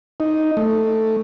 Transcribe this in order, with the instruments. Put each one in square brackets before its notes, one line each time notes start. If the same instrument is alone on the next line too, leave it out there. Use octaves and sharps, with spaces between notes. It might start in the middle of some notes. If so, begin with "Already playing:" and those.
[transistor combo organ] D#4
A3